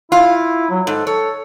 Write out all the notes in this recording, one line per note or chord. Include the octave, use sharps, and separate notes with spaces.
E4 F4
F#3
G#2 A4
A4 C#5